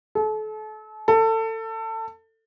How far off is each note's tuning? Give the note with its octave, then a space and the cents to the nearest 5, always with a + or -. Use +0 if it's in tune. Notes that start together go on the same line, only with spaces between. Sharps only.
A4 -35
A4 +25